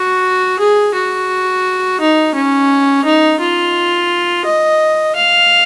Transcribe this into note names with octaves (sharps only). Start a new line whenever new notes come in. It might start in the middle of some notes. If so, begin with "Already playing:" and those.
Already playing: F#4
G#4
F#4
D#4
C#4
D#4
F4
D#5
F5